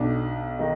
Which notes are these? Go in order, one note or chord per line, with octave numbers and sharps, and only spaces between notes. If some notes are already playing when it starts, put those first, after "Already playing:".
Already playing: B1 B2 D4
D#3 D#4